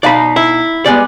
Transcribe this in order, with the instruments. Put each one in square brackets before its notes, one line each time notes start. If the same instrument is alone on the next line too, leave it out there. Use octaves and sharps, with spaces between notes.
[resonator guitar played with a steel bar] B2 D#4 F5 [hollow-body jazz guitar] D5 B5
[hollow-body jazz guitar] E4
[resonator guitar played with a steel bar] G3 G#3 B3 [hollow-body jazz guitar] D5